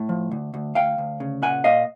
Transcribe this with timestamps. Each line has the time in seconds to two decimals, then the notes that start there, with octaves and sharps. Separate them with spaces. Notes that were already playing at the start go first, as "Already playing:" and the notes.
Already playing: A2
0.09 F3
0.32 D2
0.54 D2
0.75 D2 F5 G5
0.98 D2
1.20 C#3
1.42 A#2 F#5 G#5
1.64 A#2 D#5 F5